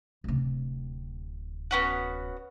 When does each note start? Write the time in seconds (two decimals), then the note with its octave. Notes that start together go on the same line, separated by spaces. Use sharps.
0.24 D1 C3
1.71 B3 C#4 F#4